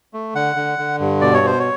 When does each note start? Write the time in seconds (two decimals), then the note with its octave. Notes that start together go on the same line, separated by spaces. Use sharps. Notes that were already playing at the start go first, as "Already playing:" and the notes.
0.14 A3
0.35 D3 F#5
0.56 D3
0.79 D3
1.00 G2
1.21 B2 D5
1.34 C#5
1.43 B2 C5
1.60 C#5